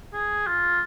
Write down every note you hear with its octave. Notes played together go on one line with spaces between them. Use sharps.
G#4
F4